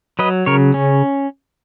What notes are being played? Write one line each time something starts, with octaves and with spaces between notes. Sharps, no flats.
F#3 B4 D#5
C#3 A#4 C#5
C#4